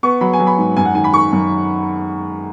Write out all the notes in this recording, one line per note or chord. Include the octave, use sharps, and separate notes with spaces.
B3 C#6
F#3 B5
G#5
F#3
B5
G#2
F#2 G#5
F#5
D#3 G#5
B5
D#3 C#6
F#2